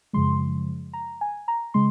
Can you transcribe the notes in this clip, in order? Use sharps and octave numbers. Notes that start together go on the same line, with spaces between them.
F#2 C#3 F3 G#3 C6
A#5
G#5
A#5
C#3 G#3 C6